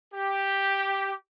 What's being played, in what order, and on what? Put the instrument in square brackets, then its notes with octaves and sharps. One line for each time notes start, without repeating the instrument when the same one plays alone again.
[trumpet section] G4